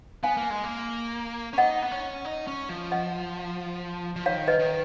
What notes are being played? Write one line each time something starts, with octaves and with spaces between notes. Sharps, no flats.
B3 F5 G#5
A#3
G#3
A#3
C#4
D#4 D#5 F#5
B3
C#4
D#4
C#4
F3
D#5 F#5
F3
D#3 C#5 F5
B4 D#5
D#3